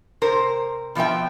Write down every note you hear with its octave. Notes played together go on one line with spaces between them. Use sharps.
C3 A#4 C5
B2 F3 C4 E5 G5